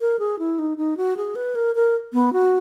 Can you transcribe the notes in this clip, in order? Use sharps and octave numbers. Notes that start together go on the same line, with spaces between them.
A#4
G#4
E4
D#4
D#4
F#4
G#4
B4
A#4
A#4
B3
F#4